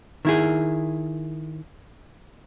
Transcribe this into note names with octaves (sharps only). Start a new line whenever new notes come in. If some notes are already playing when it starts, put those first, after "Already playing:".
D#3 E4 G#4